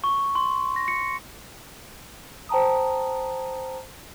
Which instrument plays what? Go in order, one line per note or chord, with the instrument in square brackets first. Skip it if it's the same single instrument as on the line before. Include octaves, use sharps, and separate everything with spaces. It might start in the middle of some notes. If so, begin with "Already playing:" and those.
[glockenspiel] C#6
C6
A#6
C#7
[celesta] C5 G5 A5 A#5 D#6